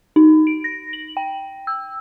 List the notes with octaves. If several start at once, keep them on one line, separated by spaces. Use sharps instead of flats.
D#4
D7
A#6
F#7
G5
E6